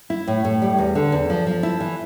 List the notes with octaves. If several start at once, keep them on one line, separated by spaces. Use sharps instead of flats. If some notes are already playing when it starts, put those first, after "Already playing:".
E4
A2
A2
G3
E2
D3
E2
F3
F3
E4
E3